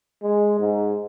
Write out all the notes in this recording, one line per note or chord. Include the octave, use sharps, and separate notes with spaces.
G#3
G#2